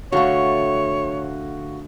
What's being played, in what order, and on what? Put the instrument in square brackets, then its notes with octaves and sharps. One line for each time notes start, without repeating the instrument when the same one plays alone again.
[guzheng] D3 A3 [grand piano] F#4 F5 C#6 [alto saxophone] C#5